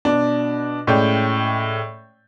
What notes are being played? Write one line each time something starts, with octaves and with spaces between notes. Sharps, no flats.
B2 D4
A2 G#3 C#4 D5 G5 G6